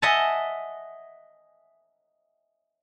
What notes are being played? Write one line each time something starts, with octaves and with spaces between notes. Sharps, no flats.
D#5 E5 F#5 G#5 A5